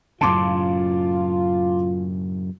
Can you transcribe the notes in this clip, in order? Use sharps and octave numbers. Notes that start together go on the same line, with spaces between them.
F#2 A2 C#3 F4 A5 C6 D6